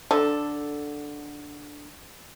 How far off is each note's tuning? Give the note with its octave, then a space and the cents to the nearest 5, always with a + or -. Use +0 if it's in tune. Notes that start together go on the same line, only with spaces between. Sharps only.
D3 +0 A4 +0